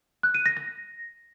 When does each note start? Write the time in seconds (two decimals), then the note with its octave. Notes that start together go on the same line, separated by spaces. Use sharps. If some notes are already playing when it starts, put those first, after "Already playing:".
0.23 F#6
0.35 D#7
0.46 A#6
0.57 A#6